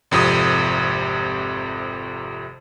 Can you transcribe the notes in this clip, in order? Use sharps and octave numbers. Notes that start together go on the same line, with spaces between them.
G#1 F2 C3 D#6